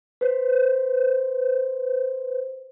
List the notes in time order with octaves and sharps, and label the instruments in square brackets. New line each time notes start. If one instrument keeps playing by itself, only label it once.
[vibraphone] B4 C5